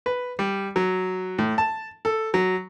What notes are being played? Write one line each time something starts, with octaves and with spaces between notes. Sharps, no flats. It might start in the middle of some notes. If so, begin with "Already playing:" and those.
B4
G3
F#3
A2
A5
A4
F#3